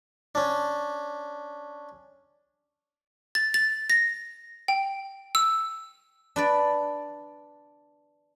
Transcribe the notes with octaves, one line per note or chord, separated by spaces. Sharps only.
C#4 D4
A6
A6
A#6
G5
E6
D4 B4 D5